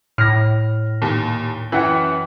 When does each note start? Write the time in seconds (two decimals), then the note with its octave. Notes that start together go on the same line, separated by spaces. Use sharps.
0.18 A2 F6 A#6
1.02 D#2 A#2
1.72 F#2 E3 E4 F#5 G5